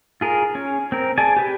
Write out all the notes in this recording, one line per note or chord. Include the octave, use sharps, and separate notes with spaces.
F4 G#4 A#4
C#4
C4 A#4
G#4 D5 G#5 A5
G4 B4